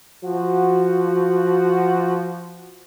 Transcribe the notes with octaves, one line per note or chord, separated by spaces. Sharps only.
F3 F#4